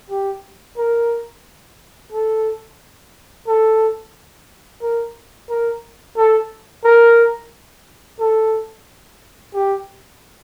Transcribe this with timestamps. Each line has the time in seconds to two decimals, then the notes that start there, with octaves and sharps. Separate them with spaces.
0.10 G4
0.78 A#4
2.12 A4
3.47 A4
4.82 A#4
5.50 A#4
6.17 A4
6.84 A#4
8.20 A4
9.54 G4